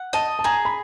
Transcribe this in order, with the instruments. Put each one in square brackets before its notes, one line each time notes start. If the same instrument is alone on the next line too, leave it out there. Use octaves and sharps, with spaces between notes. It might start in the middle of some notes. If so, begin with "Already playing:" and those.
Already playing: [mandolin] F#5
[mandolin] D#5 [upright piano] A5
[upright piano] A5
[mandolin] G#4 [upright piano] A#5
[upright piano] B5